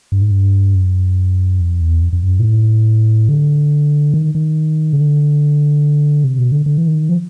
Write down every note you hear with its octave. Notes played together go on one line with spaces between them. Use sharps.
G2
G#2
G2
F#2
F2
E2
F2
F2
F#2
A#2
A2
D3
D#3
D#3
C#3
D3
C3
B2
D3
D3
E3
D#3
F3